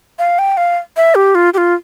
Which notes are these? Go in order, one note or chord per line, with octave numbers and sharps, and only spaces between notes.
F5
G5
F5
E5
G4
F4
G4
F4